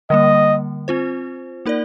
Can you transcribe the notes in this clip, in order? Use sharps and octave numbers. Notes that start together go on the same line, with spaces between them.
D3 G3 A#3 D#5
C4 F4 C5
A#3 D#4 A#4 D5